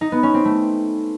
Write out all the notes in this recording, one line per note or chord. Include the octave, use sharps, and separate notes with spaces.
D#4
B3
C#4
C4
A3